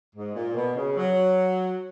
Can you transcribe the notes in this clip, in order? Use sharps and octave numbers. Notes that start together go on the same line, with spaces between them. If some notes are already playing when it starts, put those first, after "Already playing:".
G#2
A#2
B2
C#3
F#3